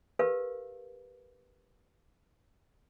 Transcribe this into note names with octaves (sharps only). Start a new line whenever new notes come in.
G4 A#4 B4 F5